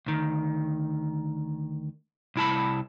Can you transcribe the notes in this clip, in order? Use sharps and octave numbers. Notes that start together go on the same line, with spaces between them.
D2 D#3
C2 E4 A5 B5